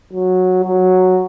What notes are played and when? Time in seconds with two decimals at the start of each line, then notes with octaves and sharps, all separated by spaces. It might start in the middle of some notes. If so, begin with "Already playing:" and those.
0.13 F#3
0.64 F#3